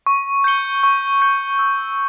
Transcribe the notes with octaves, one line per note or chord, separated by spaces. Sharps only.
C#6
G6 C#7 G7
C#6
G6 C#7 G7
E6